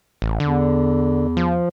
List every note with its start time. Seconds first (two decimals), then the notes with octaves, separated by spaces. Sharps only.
0.22 A1
0.40 E2 D3
1.37 F3